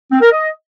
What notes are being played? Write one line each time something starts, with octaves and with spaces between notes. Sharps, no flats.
C4
A#4
D#5